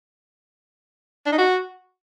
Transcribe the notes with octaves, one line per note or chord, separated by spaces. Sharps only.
D4
D#4
F#4